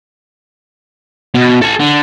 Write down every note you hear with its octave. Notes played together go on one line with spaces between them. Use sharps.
B2
A4 G#5
D3